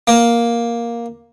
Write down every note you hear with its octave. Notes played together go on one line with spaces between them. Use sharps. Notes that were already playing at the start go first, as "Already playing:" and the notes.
A#3